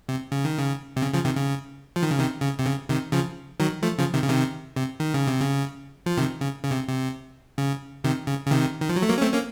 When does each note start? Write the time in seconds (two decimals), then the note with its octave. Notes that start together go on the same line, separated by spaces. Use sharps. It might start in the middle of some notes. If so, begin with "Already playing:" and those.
0.09 C3
0.32 C#3
0.45 D#3
0.59 C#3
0.97 C3
1.02 C#3
1.13 C#3 F3
1.25 C3 D#3
1.36 C#3
1.96 F3
2.03 D#3
2.11 C#3
2.19 C3 D#3
2.42 C#3
2.59 C3
2.66 C#3
2.90 C3 D#3
3.12 C#3 F3
3.60 D#3 F#3
3.83 F3 A3
3.98 C#3 F3
4.14 C3 D#3
4.24 C#3
4.29 C3 D#3
4.76 C3
5.00 D#3
5.14 C#3
5.27 C3
5.41 C#3
6.06 F3
6.18 C3 D#3
6.41 C#3
6.64 C#3
6.71 C3
6.87 C3
7.58 C#3
8.04 C3 D#3
8.27 C#3
8.47 C#3
8.51 C3 D#3
8.82 D#3
8.89 F3
8.96 F#3
9.02 A3
9.09 F#3 A#3
9.18 C#4
9.22 A3 C4
9.33 A#3 C#4